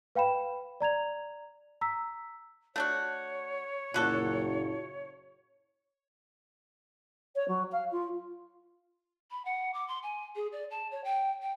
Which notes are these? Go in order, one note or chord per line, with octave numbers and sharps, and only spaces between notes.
B4 F5 G5 B5 E7
D5 A#5 G#6 F7
A#5 E6 B6
A3 D4 F#4 C#5
F#1 A#2 D3 F#4 A4
C#5
F#3
F5
F4
B5
F#5
D6
C6
G#5
G#4
D5
A5
C#5
G5
G5